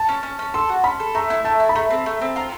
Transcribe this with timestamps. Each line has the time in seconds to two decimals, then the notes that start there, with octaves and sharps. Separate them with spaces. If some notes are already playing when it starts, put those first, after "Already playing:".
Already playing: A5
0.09 C#4
0.23 C#4
0.39 C#4
0.54 A4 C6
0.69 F#4
0.84 C#4 B5
1.00 A4
1.15 A3 A#5
1.30 E4
1.45 A3 A5
1.60 E4
1.69 B5
1.75 A3 A#5
1.90 C4
2.06 A3
2.21 C4
2.36 F4 A#5